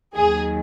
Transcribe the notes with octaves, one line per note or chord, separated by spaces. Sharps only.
D#2 D#3 F#3 G#4